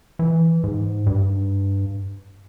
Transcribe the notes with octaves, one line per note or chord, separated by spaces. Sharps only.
E3
G#2
G2